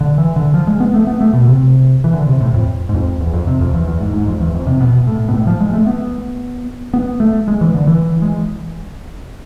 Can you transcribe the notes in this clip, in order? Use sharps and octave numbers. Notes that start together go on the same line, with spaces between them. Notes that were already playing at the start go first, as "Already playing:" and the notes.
D3
E3
D3
F3
G#3
B3
A3
B3
A3
B2
C3
E3
D3
C3
A2
F2
G#2
F2
E2
F2
C3
F2
E2
E2
G#2
G#2
F2
E2
F2
C3
B2
A2
B2
A2
F3
G#3
A3
B3
B3
A3
G#3
E3
D3
E3
G#3